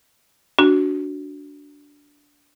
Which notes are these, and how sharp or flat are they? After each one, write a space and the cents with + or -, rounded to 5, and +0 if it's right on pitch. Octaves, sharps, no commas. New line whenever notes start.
D4 -15 F#4 +0